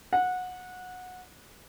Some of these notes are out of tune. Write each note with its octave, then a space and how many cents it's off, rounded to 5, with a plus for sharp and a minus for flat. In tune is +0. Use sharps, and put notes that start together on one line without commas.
F#5 -20